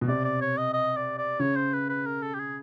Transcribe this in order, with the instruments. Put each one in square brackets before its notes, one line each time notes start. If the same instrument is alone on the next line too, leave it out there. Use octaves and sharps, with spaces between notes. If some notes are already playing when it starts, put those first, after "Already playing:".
[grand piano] B2
[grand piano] C3 [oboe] D5
[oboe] D5
C#5
D#5
D#5
D5
D5
[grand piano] C#3 [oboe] C#5
[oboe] C5
B4
B4
A#4
A4
G4
G#4